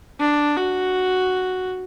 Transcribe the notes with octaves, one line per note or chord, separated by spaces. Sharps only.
D4
F#4